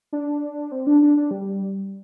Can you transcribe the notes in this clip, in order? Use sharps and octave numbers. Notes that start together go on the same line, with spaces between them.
D4
C4
D4
D4
D4
G3